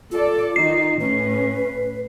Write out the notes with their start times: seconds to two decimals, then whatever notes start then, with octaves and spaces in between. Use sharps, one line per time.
0.11 F4 A4 D5
0.56 D#3 D#4 C7
1.00 A2 C#4 B4